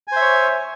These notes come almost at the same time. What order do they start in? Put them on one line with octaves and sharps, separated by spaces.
G#5 C5 E5 C#5